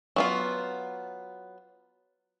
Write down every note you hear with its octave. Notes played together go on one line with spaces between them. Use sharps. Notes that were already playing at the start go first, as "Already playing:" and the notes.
F#3 B3 F4